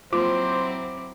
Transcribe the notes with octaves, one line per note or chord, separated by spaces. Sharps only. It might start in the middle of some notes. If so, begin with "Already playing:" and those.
F#3 A#3 C4 E4 F4 C5 D6